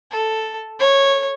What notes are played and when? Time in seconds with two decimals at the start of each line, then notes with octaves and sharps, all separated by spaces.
0.11 A4
0.79 C#5